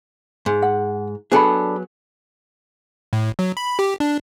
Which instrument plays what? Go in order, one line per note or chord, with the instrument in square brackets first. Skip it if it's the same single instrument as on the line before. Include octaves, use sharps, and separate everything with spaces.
[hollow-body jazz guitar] G#2
[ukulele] F#5
[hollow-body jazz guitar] F#3 B3 G#4 [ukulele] D4 A4 B5
[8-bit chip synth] A2
F#3
B5
G4
D4